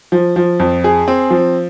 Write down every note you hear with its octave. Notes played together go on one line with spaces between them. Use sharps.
F3
F3
F2
G#4
C4
F3